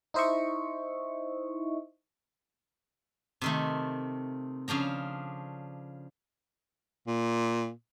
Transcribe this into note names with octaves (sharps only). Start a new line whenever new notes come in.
D#4 E4 C5 D#5 E5 C#6
C3 D#3 A3
C#3 F3 D4 A#5
A#2